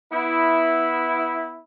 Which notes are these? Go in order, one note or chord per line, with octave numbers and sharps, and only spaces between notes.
B3 E4